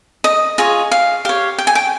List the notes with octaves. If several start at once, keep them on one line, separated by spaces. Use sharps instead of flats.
D#5
F4 G#4 C#5 D#5
F5
G4 C#5 F5
G5
G#5
G5